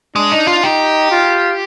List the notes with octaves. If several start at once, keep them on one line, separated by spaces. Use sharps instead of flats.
G#3 D4
D#4
F4
D#4 G4
F4